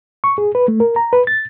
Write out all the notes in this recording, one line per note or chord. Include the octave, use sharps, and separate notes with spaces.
C#6
G#4
B4
A3
A#4
A#5
B4
A6